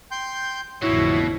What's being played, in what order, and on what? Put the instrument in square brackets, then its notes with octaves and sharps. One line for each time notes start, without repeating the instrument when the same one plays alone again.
[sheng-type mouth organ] G5 C6 G6
[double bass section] A1 F2 D3 [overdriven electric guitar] B2 [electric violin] E4 [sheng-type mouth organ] C#5